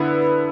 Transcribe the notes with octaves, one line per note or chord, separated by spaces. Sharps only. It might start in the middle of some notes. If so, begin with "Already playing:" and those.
Already playing: D3 B3 E4